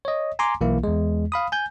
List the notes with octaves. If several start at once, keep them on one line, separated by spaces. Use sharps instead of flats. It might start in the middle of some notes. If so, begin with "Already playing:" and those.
C#5 D#5
G#5 A#5 C6 D6
B1 E3 A#3 E4
E2 G#3
F5 B5 D#6
G#5 G6